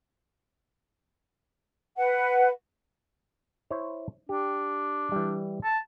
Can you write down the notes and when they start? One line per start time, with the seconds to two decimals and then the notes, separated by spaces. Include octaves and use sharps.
1.97 B4 F#5
3.70 E4 C5 C#5
4.29 D4 G4
5.12 E3 G3
5.64 A5